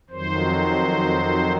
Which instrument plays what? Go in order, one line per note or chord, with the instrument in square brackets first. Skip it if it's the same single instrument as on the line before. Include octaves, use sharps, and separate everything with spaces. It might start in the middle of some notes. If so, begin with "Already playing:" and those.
[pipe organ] F2 D#3 F#3 C5